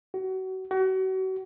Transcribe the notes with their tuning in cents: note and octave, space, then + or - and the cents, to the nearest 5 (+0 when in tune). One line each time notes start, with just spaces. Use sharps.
F#4 +30
F#4 +35